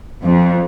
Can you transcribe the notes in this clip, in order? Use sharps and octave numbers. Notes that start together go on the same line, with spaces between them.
F2